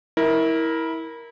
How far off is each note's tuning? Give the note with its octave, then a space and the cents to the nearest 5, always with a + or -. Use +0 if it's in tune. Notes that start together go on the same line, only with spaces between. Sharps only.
E4 -20 A#4 +5